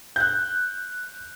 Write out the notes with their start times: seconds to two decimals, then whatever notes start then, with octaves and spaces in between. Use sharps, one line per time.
0.16 F#6 G6